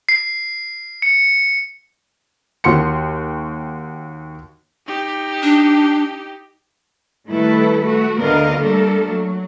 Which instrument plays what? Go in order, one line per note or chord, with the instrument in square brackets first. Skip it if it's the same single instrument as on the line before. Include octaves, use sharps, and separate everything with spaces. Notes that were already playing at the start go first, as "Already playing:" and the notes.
[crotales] C7
C#7
[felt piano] D#2 F#4 C6 C#7
[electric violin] D#4 G4
[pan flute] D4
[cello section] D#3 G3 A3 E4 A4 B4
A3 F#4
D2 D3 B3 A#4 D#5 F5
G3 A3 A#3 D4 A4 A#4
F#3